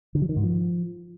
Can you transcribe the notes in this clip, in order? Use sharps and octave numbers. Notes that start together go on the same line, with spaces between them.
D3
F#3
D#3
G#2
F3